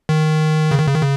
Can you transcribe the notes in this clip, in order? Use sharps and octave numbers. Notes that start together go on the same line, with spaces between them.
D#3
C#3
D#3
C#3
D#3
C#3